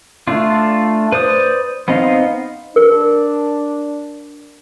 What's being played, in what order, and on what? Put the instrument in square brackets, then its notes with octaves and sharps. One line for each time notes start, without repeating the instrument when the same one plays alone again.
[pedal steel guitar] A3 D4 F4
B4 C5 D5 D#6
B3 C4 D#4 D#5 F5
[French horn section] D4 [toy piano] A#4